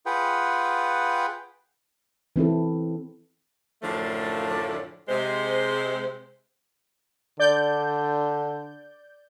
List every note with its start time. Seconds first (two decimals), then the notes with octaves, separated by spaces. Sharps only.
0.06 F4 G#4 B4 F#5 G5
2.36 E3 C4 E4 A4
3.82 F#2 A2 D3 F3 A3 D4
5.09 C3 G#3 C5
7.40 D3 D5 G6